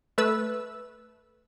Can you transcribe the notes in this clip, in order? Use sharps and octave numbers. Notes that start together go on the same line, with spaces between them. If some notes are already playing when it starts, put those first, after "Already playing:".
A3 B4 E6